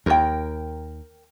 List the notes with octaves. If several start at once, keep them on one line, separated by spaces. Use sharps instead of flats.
D#2 A#4 G5